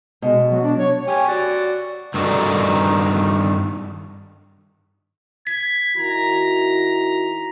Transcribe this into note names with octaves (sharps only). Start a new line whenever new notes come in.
B2 G#3
F#3
D4
C#5
G4 C#5 G#5
F#4 D5
G2 D#3 D#4 F#4 A4 D5
G#6 B6
D#3 E4 F#4 A#5